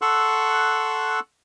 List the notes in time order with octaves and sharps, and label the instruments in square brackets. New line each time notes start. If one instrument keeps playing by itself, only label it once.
[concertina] A4 F#5 C6 C#6 E6 F#6